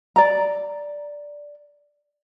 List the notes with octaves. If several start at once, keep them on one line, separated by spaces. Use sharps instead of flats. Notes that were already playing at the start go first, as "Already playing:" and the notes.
D5 A#5